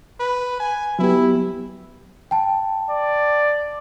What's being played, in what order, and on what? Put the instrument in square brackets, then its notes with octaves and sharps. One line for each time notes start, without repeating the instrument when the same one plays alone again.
[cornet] B4
G#5
[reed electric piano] F#3 B3 G4 [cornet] E4
[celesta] G5 A5
[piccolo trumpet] D5